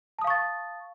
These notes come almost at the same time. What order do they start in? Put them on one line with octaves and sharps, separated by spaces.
A5 D#6 F5 C#6 A6